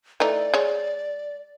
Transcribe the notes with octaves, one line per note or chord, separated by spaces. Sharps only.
E3 A3 D#4 D5
G#3 C#5